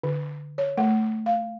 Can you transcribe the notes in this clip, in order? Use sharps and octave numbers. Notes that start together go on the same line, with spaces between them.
D3
C#5
A3
F5